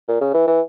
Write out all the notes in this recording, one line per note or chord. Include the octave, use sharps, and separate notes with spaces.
A#2
C#3
E3
E3